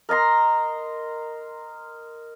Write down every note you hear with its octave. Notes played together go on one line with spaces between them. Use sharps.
A#4 D#5 A#5 C6